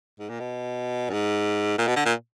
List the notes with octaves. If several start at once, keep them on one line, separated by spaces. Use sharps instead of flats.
G#2
A#2
B2
F#2
G#2
A#2
B2
D3
A#2